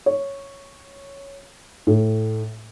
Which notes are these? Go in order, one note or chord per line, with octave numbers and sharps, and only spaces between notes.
C#5
A2